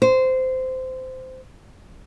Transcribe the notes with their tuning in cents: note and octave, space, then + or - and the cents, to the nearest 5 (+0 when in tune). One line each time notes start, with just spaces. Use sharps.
C5 -15